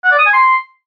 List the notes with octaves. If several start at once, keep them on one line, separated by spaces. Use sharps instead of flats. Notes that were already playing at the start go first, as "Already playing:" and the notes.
F#5
D5
D#6
G#5
C6